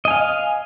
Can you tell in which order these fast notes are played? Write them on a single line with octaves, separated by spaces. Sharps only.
D#5 G#5 F5